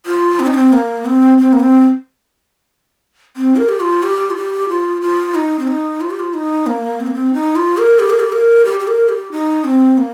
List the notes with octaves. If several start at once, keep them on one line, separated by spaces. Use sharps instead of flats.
F4
C4
D#4
C4
A#3
C4
C4
A#3
C4
C4
A#4
G4
F4
G4
F4
G4
F4
F4
D#4
C4
D#4
F4
G4
F4
D#4
A#3
C4
A#3
C4
D#4
F4
A#4
G4
A#4
G4
A#4
G4
G4
A#4
G4
D#4
C4
A#3